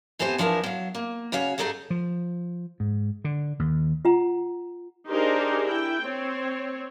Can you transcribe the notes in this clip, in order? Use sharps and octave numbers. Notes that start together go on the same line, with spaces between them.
F2 E3 B3 G4 C5 G#5
E2 F3 D4 E4 A#4
F#3 F5
A#3
C#3 F#4 C#5 F5
G2 E3 D#4 G#4 A4 F#5
F3
G#2
D3
D#2
F4 F#5 A#5
D4 D#4 G4 G#4 A#4 C5
E4 G5
C4 C#5